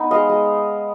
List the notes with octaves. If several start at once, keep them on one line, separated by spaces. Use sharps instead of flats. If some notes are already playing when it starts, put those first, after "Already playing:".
Already playing: B3 D#4
G#3 D#5 F5
G#3